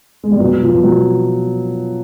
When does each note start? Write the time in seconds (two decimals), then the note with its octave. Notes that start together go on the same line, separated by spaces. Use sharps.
0.24 G#3
0.32 G3
0.40 B2 F#3
0.62 F3
0.69 B2
0.84 F#3